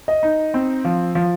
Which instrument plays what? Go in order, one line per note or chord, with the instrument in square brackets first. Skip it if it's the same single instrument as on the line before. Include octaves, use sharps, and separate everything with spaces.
[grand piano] D#5
[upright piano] D#4
C4
F3
F3